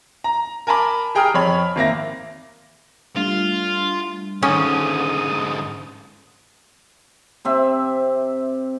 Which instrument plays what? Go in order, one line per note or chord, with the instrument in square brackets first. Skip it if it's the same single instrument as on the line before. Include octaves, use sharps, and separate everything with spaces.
[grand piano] A#5
A#4 G#5 A5 B5 D6
G4 G#4 G5 A#5 D#6 F6
F2 C#5 B5
G#1 A#3 E5 A#6
[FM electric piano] G3 A3 D4 [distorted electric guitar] F4
[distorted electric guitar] G#2 D3 [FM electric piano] D#3 [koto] C#4 [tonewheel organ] D#6
[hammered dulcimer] C3 C4 E5